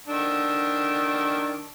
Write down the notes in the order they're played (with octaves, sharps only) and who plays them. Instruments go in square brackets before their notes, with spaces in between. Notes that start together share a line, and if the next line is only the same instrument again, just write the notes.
[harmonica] D#3 D4 E6